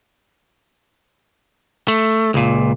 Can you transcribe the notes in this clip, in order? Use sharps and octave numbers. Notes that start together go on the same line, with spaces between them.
A3
C#2 A#2